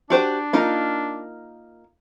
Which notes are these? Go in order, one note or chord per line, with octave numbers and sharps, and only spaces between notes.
D4 F#4 G4 C5
A#3 D#4 F4